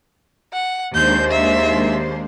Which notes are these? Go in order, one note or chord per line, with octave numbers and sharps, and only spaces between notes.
F#5
D#2 G#3 A#3 D4 C5 G6
E5